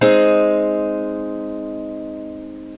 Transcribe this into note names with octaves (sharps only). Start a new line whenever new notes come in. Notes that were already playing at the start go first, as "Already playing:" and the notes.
G#3 C4 D#4